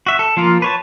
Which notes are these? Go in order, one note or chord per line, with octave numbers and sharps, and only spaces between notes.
F#4 E5
A4
F3 A#3 F4 A#4
B4 C#5 A5